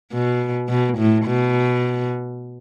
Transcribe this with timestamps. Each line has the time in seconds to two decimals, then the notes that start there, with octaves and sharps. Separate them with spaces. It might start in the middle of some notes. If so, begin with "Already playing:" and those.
0.13 B2
0.69 B2
0.98 A2
1.26 B2